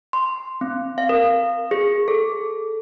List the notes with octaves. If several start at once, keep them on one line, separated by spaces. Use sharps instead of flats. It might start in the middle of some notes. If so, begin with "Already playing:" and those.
C6
C4
F5
A#4
G#4
A4